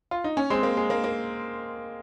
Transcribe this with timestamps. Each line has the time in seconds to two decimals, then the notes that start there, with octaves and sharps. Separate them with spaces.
0.11 F4
0.24 D#4
0.37 C#4
0.50 G#3 C4
0.63 A#3
0.77 G#3
0.90 A#3
1.04 A#3